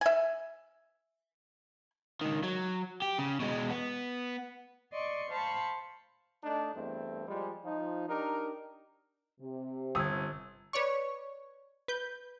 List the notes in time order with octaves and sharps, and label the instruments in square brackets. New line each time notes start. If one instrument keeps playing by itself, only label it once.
[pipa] E5 G#5
[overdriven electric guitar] C#2 D#3
F#3
G4
C#3
B2 G#3
B3
[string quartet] D5 D#5 C6 C#6
C5 F5 A5 B5 C#6
[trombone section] A3 D4 D#4
E2 G2 A3 C4
F3 G3 G#3
F3 D#4
D4 D#4 G4 A#4
[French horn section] C3
[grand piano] G1 D#6 [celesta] E6 G#6
[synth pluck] B4 C#5 D5 C#6
B4 G6